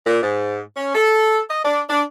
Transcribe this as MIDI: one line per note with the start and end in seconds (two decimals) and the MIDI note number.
0.06 0.21 46
0.22 0.60 44
0.77 0.94 61
0.94 1.39 69
1.50 1.60 75
1.65 1.82 62
1.90 2.02 62